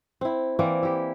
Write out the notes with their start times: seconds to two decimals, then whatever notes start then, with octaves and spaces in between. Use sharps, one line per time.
0.21 C4 E4
0.59 E3 A#3 C4 D5
0.83 E4 G4